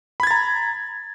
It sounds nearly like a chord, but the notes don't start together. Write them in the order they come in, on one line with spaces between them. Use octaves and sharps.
B5 G#6 A6 A#5